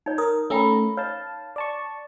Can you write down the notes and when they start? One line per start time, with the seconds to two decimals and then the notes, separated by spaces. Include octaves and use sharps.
0.06 D#4 C#5
0.18 A#4 D#6
0.50 A3 C#4 A#4 G5 A#5 B5
0.97 C#5 F5 A5
1.56 D5 A5 C#6